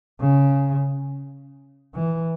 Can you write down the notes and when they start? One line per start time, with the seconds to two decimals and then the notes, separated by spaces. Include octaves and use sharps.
0.20 C#3
1.94 E3